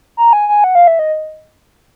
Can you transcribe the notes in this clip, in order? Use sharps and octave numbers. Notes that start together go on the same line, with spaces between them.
A#5
G#5
G#5
F#5
F5
E5
D#5